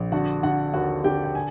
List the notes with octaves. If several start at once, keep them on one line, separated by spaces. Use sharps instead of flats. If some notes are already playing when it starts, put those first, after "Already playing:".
Already playing: A#1
D3 F#4 F#5
D3 F#4 F#5
D#2 F#4 F#5
D3 G4 G5
G5
G#5